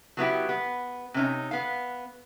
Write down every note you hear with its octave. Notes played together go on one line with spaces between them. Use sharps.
F#3 B3 E4 G4
B3
C3 C#4 D#4
B3 F5